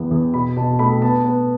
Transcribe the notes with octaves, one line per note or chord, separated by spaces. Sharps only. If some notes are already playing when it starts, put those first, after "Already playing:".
Already playing: E2 B3
E2
B2 B5
B2 A5
A3 B5
B3 A5
B3